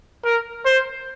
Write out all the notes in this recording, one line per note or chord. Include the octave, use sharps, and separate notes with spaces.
A#4
C5